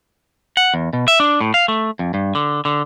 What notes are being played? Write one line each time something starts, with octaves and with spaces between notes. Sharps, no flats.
F#5
E2
B2
E5
D4
A2
F5
A3
F2
G2
D3
D3